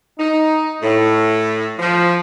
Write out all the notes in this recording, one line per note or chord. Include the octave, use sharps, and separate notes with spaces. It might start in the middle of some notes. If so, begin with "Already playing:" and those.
D#4
A2
F3